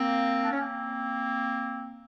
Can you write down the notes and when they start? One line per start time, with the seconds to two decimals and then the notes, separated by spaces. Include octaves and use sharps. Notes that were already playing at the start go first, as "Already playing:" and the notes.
Already playing: A#3 C4
0.43 D4
0.52 C#4
0.60 A#3 C4